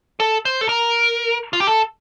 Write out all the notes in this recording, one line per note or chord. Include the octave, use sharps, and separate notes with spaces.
A4
C5
A4
A#4
F4
G4
A4